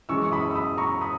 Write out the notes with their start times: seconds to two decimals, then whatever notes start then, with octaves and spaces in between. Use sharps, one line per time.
0.09 F#2 E3 G#3 C#6 E6
0.23 C#6
0.32 B5 D#6
0.51 E6
0.55 B5 D#6
0.78 A#5 C#6
1.01 B5 D#6